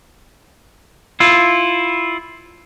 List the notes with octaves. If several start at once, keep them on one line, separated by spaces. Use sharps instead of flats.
E4 F4